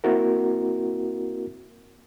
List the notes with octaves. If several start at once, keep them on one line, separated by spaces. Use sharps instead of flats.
A#3 C4 E4 F#4 A#4